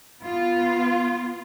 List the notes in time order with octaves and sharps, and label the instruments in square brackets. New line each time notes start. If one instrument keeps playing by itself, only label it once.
[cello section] B3 F4